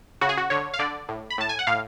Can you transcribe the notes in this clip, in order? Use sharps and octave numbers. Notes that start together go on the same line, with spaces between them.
C#3 F#4
G#4
F#4
D3 C#5
F5
D3 D5
A2
B5
A2 A5
G#5
F#5
A2 F5